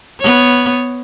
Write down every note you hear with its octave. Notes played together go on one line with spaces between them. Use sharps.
B3 C#5